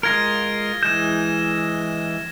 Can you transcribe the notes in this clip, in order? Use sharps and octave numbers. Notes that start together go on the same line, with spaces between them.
G#3 F4 A#4 F6 G#6 A#6
E3 G#3 G6 E7